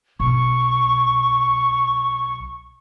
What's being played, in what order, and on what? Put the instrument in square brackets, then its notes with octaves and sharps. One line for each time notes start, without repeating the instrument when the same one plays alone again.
[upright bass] B1 [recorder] C#6